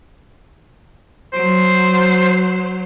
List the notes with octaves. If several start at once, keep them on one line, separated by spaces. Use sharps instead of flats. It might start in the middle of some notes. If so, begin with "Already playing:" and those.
F#3 C5